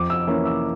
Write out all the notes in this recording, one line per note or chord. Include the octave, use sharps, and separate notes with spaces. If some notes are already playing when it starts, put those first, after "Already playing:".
Already playing: F2 D6
E6
E3 A#3 C#4
E6